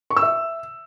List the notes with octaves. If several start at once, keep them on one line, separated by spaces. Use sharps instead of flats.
C#6
E6
E5